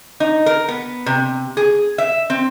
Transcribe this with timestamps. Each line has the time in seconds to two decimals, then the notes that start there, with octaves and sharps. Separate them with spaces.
0.20 D#4
0.46 A#4
0.68 B3
1.06 C3
1.57 G#4
1.98 E5
2.30 C4